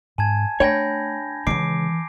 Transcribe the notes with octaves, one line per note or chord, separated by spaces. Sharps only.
G#2 G#5 A5 G#6
A3 D4 C#5 G5 B5 G6 A#6
C#2 G#2 D#3 E3 D6 C7 D7